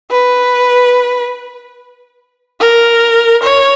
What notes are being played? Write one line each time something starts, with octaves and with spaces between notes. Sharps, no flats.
B4
A#4
C#5